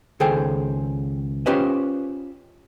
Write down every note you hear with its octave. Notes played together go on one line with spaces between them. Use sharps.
C#2 D#3 G#4 A4 C5 G5
C#4 F4 G4 B4 C5 D#5